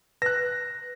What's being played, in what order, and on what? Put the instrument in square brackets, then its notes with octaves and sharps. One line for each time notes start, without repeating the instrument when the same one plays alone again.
[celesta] B4 [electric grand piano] F#6 A#6